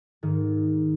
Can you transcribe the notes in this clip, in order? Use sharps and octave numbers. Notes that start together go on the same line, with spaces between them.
G#2 D#3